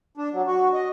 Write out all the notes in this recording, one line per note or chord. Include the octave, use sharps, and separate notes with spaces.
D4
F#3
F#4
D#5